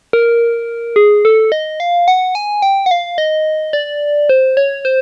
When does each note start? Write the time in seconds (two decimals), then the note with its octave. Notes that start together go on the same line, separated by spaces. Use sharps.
0.13 A#4
0.96 G#4
1.25 A4
1.52 D#5
1.80 F5
2.08 F#5
2.35 G#5
2.62 G5
2.86 F#5
2.91 F5
3.18 D#5
3.73 D5
4.29 C5
4.57 C#5
4.85 C5